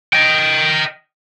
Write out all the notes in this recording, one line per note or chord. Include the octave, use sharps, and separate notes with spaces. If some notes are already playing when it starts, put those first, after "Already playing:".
D#5 G5